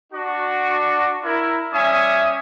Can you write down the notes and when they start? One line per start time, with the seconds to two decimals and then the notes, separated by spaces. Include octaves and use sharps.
0.13 D4 F#4
1.24 E4 A#4
1.72 G3 C#4 E5 G#5 D#6